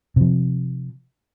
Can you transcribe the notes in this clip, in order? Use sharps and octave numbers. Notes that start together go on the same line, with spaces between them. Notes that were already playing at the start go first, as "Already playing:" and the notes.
C3 F3